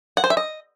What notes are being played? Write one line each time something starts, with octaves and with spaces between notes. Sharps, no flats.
F#5
C5
E5
D#5